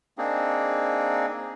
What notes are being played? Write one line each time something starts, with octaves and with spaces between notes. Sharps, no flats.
A#3 C4 D4 D#4 G#4